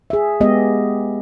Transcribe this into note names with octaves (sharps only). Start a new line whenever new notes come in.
G#4 E5
G#3 B3 G4 D#5